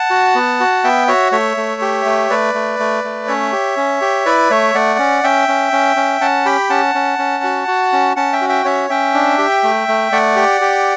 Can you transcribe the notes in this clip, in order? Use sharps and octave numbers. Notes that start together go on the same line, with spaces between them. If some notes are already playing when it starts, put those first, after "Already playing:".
Already playing: F#5 A5
F#4
B3
F#4
B3 E5 G5
F#4 C#5 E5
A3 C#5 E5
A3
G4
A3
A3 B4 D5
A3
A3
A3
C#4 C#5 E5
G4
C#4
G4
E4 B4 D5
A3 C#5 E5
A3 D5 F#5
C#4
C#4 E5 G5
C#4
C#4
C#4
C#4 F#5 A5
G4 G5 B5
C#4 F#5 A5
C#4
C#4
F#4
F#4
C#4
C#4 F#5 A5
E5 G5
F#4
E5 G5
C#4 C#5 E5
C#4 E5 G5
D4
G4
A3
A3
A3 D5 F#5
G4
G4